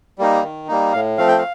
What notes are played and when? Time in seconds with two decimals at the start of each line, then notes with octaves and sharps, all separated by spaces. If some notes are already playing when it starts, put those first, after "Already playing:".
0.19 G3 A#3 D#4
0.43 D#3
0.68 G3 A#3 D#4
0.93 A2 F5
1.18 F3 A3 C4 F5
1.28 G5
1.38 F5